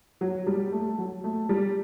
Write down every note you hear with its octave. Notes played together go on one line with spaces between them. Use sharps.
F#3
G3
A3
F#3
A3
G3